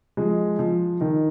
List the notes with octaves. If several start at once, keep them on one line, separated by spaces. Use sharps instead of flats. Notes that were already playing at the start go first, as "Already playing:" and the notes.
F3 G#3
F3
D#3